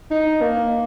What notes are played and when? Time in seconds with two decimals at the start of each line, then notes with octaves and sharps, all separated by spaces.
0.11 D#4
0.41 A#3